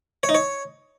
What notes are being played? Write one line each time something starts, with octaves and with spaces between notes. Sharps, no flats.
C#5
D#4
C#5